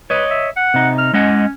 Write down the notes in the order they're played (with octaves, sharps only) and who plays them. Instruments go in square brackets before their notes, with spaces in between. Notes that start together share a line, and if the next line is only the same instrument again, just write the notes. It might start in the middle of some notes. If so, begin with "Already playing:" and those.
[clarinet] B4 [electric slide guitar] C#5 D#5
[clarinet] E5
F#5
[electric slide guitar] C3 D#4
[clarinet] F6
[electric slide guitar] G#3 D#5 F#5 [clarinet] C#4